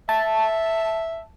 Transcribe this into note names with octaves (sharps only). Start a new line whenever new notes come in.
E5 A5